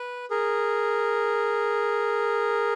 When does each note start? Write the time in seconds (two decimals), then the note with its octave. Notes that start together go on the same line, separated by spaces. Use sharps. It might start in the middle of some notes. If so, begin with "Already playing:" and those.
Already playing: B4
0.30 G#4 A#4